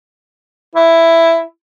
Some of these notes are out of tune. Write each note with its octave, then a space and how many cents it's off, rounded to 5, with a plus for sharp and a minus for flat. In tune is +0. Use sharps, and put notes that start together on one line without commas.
E4 +5